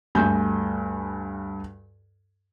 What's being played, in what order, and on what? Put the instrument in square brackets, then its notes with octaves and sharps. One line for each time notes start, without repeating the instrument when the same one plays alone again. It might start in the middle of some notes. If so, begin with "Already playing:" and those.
[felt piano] D2 G2 G#5 G6